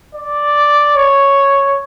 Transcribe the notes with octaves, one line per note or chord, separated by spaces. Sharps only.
D5
C#5